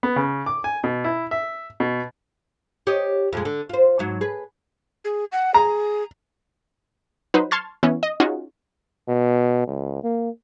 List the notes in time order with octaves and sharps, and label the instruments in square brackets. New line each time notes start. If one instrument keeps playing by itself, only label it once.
[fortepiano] B3
C#3
D6
G#5
B2
E4
E5
B2
[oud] G4 C#5 D#5
F2 A#2 G#3
D3
F4 C5
G#2 F#3
G#4 B4
[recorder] G#4
F#5
[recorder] G#4 [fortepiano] A#5
[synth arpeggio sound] F#3 D#4 B4 C5
A5 C6 C#6 F6 G#6 A6
E3 B3 C#4 E4
D#5
C#4 D#4 F4 F#4 G#4
[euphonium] B2
C#2
A#3